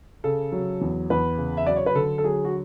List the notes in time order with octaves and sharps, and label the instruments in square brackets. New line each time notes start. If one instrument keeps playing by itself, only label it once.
[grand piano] C#3 A4
F#3
E2
E2 B4
C#3
E5
F#3 D5
C#5
B4
D3 A4
A4
F#3 G#4
F#4